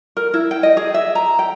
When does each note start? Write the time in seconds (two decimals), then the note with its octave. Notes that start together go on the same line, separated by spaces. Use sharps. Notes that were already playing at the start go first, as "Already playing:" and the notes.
0.17 A#4
0.34 E4
0.51 G5
0.63 D#5
0.77 G#4
0.94 E5
1.15 A#5
1.39 G5